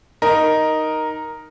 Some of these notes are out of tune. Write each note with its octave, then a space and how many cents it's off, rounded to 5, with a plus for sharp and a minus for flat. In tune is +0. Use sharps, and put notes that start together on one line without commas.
D#4 +0 A#4 +5